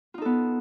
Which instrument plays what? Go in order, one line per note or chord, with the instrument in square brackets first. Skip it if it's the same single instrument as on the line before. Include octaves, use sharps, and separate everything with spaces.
[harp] F4
D#4
A4
B3